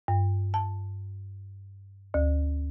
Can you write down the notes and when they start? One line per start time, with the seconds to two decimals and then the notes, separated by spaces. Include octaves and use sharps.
0.08 G2
0.54 A5
2.14 D2